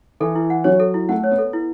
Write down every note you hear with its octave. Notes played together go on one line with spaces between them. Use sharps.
E3 A4
E4
F#5
F#3 C#5
A4
E4
A3 F#5
C#5
B3
A4
E4